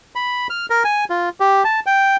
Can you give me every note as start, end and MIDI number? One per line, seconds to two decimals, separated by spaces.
0.15 0.47 83
0.50 0.66 89
0.70 0.83 70
0.85 1.05 80
1.10 1.29 65
1.40 1.64 67
1.64 1.80 81
1.86 2.16 79